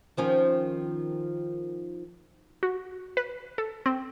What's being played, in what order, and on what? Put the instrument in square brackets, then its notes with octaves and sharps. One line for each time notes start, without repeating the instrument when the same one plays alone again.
[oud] D#3 F3 C#4
[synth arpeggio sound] F#4
B4
A4
C4